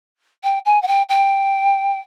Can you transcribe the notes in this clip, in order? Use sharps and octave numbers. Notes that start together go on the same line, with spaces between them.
G5
G#5
F#5
G5
G5